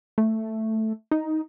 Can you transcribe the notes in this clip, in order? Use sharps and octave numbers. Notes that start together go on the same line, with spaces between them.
A3
D#4